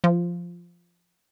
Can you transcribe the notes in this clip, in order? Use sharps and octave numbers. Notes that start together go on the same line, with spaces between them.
F3